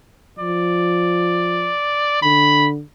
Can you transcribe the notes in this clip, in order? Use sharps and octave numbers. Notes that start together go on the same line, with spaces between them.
F3 D5
D3 B5